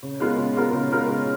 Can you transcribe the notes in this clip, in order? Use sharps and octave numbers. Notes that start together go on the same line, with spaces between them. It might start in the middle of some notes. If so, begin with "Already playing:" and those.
C#3
G#3 B3 F4 A#4
C#3
G#3 B3 F4 A#4
C#3
G#3 B3 F4 A#4
C#3